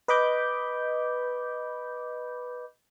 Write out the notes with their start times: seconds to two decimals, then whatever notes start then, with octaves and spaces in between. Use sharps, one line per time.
0.08 B4 D#5 B5 D6 G6